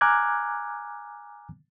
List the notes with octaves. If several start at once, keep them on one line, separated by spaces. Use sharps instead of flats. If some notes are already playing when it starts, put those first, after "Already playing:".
G#5 A#5 D6 F6 F#6 G#6